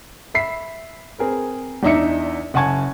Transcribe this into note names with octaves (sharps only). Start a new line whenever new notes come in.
E5 B5 B6 C7
C4 G#4 A#4 B4
E2 D4 D#4 E5 E6 C#7
F#1 F#5 G#5 A5 C#6 G#6